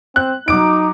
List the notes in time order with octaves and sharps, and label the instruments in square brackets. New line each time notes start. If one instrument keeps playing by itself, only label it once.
[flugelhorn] C4 [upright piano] F#6
[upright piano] F#3 D6 D7 [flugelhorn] D#4